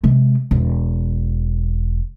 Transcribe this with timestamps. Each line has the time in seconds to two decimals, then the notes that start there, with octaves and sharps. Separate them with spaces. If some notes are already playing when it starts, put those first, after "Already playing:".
0.03 C3 G#3
0.51 E1